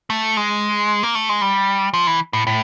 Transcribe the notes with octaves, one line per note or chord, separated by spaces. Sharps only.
A3
G#3
A#3
A3
G#3
G3
F3
E3
A2
A2